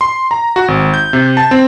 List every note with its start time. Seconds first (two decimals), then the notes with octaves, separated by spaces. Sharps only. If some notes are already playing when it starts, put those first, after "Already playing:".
0.01 C6
0.31 A#5
0.56 F#4
0.68 G#1
0.94 G6
1.13 C3
1.37 A5
1.51 C4